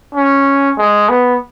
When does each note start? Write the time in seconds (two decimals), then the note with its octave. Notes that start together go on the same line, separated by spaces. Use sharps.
0.15 C#4
0.78 G#3
1.09 B3